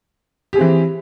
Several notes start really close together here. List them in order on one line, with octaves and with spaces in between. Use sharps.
G4 G#4 C4 E3